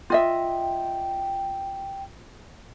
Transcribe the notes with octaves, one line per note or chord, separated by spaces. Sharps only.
F4 D#5 E5 G5